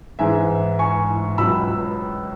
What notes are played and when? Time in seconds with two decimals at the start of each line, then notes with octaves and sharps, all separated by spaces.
0.19 G#2 E3 G#3 E5 G#5
0.79 G#5 C#6
1.38 C#2 B2 F#3 B5 E6